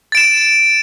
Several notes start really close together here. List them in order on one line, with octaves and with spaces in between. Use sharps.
A6 D7 E7